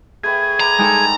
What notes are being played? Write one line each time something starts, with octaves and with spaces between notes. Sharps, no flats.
A3 G#4 B4 G5
B4 D5 A#5
G#3 D#4 A4 G5